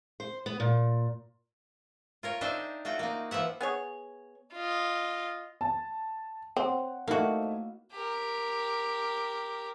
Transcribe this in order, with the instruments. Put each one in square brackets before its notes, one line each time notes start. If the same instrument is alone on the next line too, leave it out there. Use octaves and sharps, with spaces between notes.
[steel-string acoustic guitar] C5
B3
A#2
[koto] F4 A#4 C#5
D4 D#4 C5 E5 G5
A3 F4 F#4 G5
A#3 D#4
E3 F3 F4 E5 F#5
[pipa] B3 G#4 C#5
[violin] F4 D#5
[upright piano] A5
[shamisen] C4 [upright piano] C5 C#5 F#5
[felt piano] A3 D#4 E4 [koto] A#3 F#4
[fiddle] G4 A#4